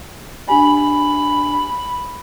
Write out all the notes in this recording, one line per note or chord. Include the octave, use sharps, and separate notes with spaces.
D4 G4 G#5 B5